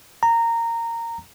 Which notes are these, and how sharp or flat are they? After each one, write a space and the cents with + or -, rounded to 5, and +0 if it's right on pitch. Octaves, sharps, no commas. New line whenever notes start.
A#5 -15